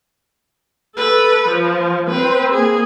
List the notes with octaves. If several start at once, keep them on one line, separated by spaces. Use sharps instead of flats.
A4 B4
F3
C4 B4
A#3 G#4